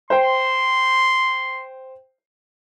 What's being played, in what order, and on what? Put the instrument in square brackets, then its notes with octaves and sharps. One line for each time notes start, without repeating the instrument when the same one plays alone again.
[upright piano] C5 G5 [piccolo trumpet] C6